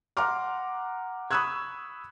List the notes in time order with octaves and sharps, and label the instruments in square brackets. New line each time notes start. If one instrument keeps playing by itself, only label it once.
[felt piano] F#5 A#5 C6 D6 F6
B5 C#6 D#6 E6 F#6 G#6